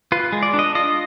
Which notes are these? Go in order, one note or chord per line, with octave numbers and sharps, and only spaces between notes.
F4 B4
G#3
D5
D4
D#5
F4 D#5